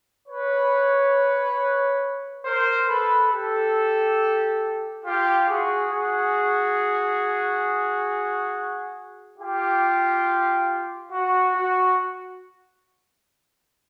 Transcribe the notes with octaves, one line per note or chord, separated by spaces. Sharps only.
B4 C#5
A#4 C5
A4 B4
G4 A4
F4 G4
F#4 G#4
F#4 G#4
F4 G4
F#4
F#4